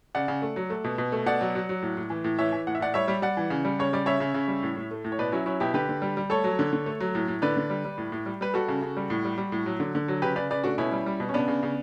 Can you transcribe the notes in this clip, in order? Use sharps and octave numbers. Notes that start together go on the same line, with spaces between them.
C#3 D5 F#5
C#3
A3
F#3
A3
B2
B2
A3
B2 D5 F#5
F#3
F#3
F#3
A2
A2
E3
A2
E3 C#5 E5
E3
A2 F#5
E5
A2 D5 F#5
G3 C#5 E5
G3
G3 D5 F#5
E3
C#3
G3
C#3 C#5
G3 D5
C#3 C#5 E5
C#3
C#3
G3
A2
A2
A3
A2
C#5
B2 B4 D5
F#3 C#4 E4
F#3 C#4 E4
B2 E4 G4
D3 G4 B4
D3
G3
G3
A3 A4 C#5
F#3
D3
D3
A3
F#3
A2
A2
D3 B4 D5
D3
G3
G3
A2
A2
G3
G3 B4
G3 F#4 A4
C#3
C#3
G3
A2
G3
G3
A2
F#3
D3
D3
F#3
C#3 G4 B4
C#3 B4 D5
C#3 B4 D5
A3 D4 F#4
B2 C#4 E4
G3
G3
B2
C#4
C#3 B3 D4
C#3
C#3